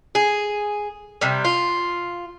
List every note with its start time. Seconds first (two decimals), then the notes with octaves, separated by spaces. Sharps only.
0.15 G#4
1.21 C3 G3
1.45 F4